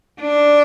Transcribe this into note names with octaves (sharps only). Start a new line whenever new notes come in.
D4